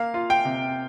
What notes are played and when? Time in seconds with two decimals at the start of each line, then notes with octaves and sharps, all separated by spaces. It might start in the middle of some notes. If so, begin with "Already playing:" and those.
Already playing: A#3 F5
0.14 F4
0.30 G5
0.45 C3